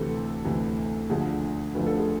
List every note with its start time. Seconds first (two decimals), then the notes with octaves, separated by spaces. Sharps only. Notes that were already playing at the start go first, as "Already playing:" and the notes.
Already playing: D2 C3 E3 A4
0.45 D2 C3 E3
1.09 D2 D3 F3 G#4
1.75 D2 D3 F3 B4
1.87 A4
1.98 G#4